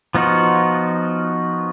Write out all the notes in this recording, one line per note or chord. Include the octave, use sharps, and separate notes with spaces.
F3 B3 D#4 F4 F#4